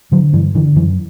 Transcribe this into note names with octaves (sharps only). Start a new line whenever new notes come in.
D3 F#3
G2 E3
D3 E3
F#2 E3